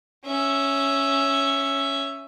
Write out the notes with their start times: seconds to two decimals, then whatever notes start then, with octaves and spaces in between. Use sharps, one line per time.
0.25 C#4 E5